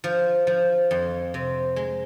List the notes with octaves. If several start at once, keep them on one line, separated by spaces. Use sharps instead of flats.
F3
F3
F2
C3
G#3